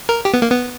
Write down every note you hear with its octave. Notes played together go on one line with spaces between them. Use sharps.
A#4
G4
B3
A#3
B3